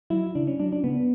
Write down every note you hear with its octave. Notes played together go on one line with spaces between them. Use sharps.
F#3 E4
C#3 D4
C#4
F#3 D4
D4
C#3 B3